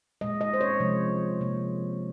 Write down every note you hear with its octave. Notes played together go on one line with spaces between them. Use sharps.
A#2 G#3 D#5
D#5
C5
C#5
C3 F3 G#3
C3 F3 A#3